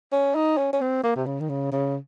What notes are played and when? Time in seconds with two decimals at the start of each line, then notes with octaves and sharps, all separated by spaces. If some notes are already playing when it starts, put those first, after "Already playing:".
0.12 C#4
0.35 D#4
0.57 C#4
0.73 C#4
0.81 C4
1.04 A#3
1.16 C3
1.26 C#3
1.40 D#3
1.49 C#3
1.72 C#3